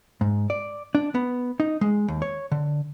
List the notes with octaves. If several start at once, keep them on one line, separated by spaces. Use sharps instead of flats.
G#2
D5
D4
B3
D#4
G#3
D#2
C#5
D3